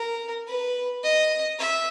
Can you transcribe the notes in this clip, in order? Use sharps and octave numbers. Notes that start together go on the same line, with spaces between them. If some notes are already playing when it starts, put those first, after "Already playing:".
Already playing: A#4
B4
D#5
E5